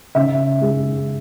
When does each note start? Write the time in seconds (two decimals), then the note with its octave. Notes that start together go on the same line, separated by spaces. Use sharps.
0.15 C#3 E5
0.61 G#3